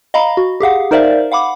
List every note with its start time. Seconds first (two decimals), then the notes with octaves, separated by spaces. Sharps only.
0.14 D#5 F5 A#5 B5
0.37 F#4
0.60 G4 G#4 F5 F#5
0.91 D#4 A#4 C5 D5 E5 F5
1.32 F5 F#5 B5 D6